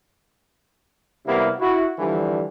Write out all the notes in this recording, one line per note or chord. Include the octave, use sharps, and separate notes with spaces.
C3 G3 A#3 B3 E4
E4 F#4
D3 E3 F3 G3